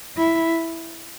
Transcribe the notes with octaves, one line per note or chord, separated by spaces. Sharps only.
E4